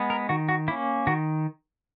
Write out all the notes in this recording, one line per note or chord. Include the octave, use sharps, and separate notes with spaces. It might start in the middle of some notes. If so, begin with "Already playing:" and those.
Already playing: G#3 B3
A#4
D#3 F#4
F#4
A#3 C#4 E4
D#3 F#4